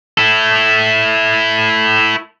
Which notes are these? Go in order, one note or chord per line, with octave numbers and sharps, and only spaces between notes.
E4 A4